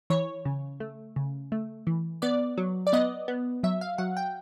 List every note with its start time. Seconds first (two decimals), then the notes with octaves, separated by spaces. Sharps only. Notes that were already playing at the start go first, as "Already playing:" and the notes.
0.10 E3 C#5
0.45 C#3
0.80 A3
1.16 C#3
1.52 A3
1.87 E3
2.22 B3 D5
2.58 F#3
2.87 D5
2.93 B3 D#5
3.28 B3
3.63 F#3 E5
3.81 F5
3.98 F#3 F#5
4.17 G5